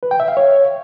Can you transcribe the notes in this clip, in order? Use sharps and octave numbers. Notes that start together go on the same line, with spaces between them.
B4
G5
E5
F5
C#5